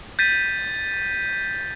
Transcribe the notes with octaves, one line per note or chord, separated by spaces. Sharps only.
G6 A6 B6 D#7